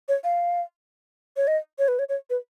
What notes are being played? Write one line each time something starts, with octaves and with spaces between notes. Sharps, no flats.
C#5
F5
C#5
D#5
C#5
B4
C#5
C#5
B4